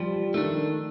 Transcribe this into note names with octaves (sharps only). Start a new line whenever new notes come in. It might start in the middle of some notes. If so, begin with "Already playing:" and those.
Already playing: F3 G3
D#3 A3 D4